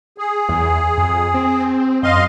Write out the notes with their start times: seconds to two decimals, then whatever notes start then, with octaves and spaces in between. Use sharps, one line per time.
0.18 G#4
0.49 E2
0.97 F2
1.34 C4
2.03 F#2 D#5 F5 C6